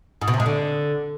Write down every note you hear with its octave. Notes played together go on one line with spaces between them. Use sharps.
G#2
B2
C3
G#3
D3